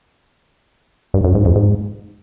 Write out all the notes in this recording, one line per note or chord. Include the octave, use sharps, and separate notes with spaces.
G2
F#2
G#2
F2
G#2